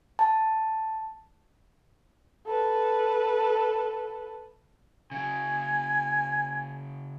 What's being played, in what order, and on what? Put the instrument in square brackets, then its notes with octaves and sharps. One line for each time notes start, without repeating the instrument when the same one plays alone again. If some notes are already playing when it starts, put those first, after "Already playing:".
[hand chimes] A5
[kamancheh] A4 B4
[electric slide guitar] C#3 F#3 [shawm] G#5